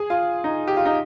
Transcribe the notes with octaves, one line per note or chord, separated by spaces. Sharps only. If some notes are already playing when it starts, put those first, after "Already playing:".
Already playing: G#4
F4
D#4
G4
F4
D#4